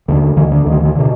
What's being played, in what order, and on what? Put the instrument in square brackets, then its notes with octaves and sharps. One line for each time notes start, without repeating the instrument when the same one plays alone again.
[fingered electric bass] D#2 D3
D2 D3 D#3
D3
D2 D3 D#3
D#3
B2 D3